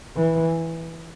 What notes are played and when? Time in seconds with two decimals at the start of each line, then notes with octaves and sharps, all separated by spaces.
0.17 E3